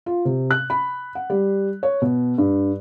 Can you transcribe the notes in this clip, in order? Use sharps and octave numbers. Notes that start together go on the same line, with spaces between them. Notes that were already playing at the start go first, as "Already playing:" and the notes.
F4
C3
F#6
B5
F#5
G3
C#5
B2
G2